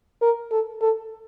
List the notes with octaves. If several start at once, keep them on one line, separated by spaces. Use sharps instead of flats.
A#4
A4
A4